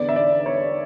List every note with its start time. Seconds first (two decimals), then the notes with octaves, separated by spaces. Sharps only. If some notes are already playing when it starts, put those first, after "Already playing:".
Already playing: E2 D3 D5
0.09 E5
0.16 D5
0.46 C#5